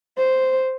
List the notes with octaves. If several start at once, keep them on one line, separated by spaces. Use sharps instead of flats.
C5